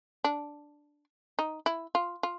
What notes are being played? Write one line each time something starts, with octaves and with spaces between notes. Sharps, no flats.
D4
D#4
E4
F4
F4